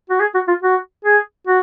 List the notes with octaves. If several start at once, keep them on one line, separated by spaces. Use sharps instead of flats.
F#4
G#4
F#4
F4
F#4
G#4
F#4